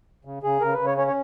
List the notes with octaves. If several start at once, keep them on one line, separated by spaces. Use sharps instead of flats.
C#3
C#3 G#4
C#3 A#4
B4
C#3
C#5
C#4 C#5
C#5